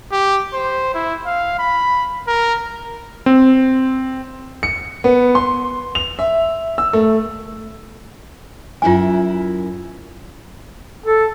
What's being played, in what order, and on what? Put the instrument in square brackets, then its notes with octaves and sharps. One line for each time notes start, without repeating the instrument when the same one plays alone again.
[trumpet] G4
C5
E4
F5
B5
A#4
[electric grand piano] C4
[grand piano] C#7
B3
C6
F7
E5
E6
A3
[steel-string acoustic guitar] F#2 E4 A#4 [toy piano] F4 G#5
[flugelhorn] A4